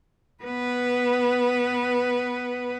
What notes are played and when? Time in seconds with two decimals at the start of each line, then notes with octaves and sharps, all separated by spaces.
0.44 B3 B4